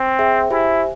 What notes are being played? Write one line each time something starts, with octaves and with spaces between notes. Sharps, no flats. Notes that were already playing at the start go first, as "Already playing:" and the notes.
Already playing: C4
G#4 E5 G5
E4 G4 C5 E5 G#5